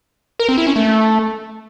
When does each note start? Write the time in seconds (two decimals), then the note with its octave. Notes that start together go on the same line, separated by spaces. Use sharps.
0.40 A#4
0.49 C4
0.58 E4
0.67 C#4
0.76 A3